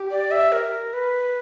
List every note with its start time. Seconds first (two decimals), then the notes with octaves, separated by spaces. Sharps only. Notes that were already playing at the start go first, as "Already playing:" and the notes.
Already playing: G4
0.11 D5
0.31 E5
0.52 A#4
0.93 B4